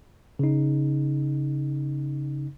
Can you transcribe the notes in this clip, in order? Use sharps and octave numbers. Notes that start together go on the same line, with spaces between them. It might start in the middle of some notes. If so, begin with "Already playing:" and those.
C#3 D#4